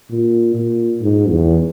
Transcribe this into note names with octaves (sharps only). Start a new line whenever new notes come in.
A#2
A#2
G#2
E2